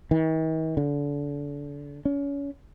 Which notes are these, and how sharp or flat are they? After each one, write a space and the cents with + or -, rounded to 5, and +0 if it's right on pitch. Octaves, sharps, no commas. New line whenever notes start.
D#3 +45
D3 -30
C#4 +30